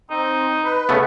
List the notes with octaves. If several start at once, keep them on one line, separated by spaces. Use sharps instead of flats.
C4 D#4
B4
C#3 A3 B3